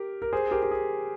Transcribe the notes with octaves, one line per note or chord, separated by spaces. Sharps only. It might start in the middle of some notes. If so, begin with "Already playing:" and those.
Already playing: G4 A#4
A#4
G#4 C5
G4 A#4
G4
G#4